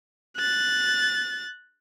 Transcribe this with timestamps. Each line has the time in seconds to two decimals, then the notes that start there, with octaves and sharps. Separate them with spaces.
0.37 F#6 A6